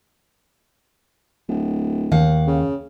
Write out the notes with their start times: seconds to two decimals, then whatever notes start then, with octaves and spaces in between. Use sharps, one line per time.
1.49 D1
2.11 D#2 F5 F#5
2.47 C#3